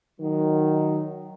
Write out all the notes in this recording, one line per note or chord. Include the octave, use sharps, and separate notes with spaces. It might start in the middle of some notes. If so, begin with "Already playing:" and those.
D#3 F#3